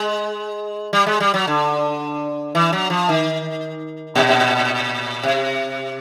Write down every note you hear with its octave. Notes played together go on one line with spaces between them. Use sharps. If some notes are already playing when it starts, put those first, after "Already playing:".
Already playing: G#3
G3
G#3
G3
F#3
D3
E3
F#3
F3
D#3
A#2
C3